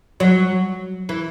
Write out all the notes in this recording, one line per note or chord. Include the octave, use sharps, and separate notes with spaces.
F#3
E3